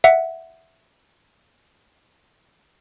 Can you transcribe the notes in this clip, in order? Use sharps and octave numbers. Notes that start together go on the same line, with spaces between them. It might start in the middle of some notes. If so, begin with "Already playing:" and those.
E5 F#5